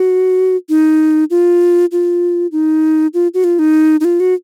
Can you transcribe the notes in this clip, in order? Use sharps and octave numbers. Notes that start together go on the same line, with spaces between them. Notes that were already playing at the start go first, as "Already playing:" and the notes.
Already playing: F#4
D#4
F4
F4
D#4
F4
F#4
F4
D#4
D#4
F4
F#4